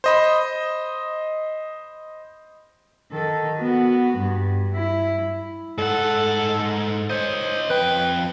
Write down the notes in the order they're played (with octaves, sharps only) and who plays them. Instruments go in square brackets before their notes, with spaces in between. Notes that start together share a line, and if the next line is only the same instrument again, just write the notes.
[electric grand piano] C5 D#5 B5
[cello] D#3 A4
B3 F#4
G2
E4
[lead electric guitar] G#2 F#5 [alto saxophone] A4
[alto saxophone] C5 [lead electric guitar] C#5 D#5
[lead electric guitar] F2 G5 [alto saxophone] B4